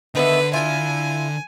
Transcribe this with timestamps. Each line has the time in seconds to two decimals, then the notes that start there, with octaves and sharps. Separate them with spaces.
0.15 D3 D#3 B3 B4 E5
0.53 E4 F4 G#5